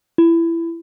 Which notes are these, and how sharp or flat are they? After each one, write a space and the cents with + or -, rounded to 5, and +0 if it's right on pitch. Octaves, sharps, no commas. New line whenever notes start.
E4 +20